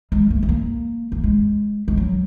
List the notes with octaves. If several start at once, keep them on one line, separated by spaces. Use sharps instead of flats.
G#3
A#3
G#3
A#3
A#3
G#3
G#3
F#3